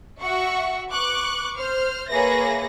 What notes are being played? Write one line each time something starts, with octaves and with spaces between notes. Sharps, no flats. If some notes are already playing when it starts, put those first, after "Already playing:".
F#4 E5 F#5 C#6
B4 C#6 D6 F#6
C5 F6
A#3 G#4 B4 C#5 E5 A#6